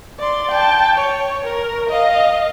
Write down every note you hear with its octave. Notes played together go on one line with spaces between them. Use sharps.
D5 C6
G5 A5
C#5
A#4
D#5 F5